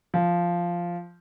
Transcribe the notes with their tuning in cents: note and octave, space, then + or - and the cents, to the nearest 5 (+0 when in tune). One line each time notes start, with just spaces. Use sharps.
F3 -5